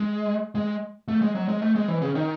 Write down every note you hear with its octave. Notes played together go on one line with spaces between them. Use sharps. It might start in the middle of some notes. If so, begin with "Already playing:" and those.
Already playing: G#3
G#3
A3
G#3
F#3
G#3
A3
G#3
E3
C#3
D#3